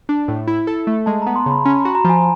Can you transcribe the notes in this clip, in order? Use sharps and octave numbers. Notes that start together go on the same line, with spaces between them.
D4
A2
E4
A4
A3
G#3 A5
B3 A#5
C6
C#3 B5
C#4
F#4 A#5
A#5
F3 G#5